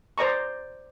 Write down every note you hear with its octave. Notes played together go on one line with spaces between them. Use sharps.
C5 D5 A#5 C#6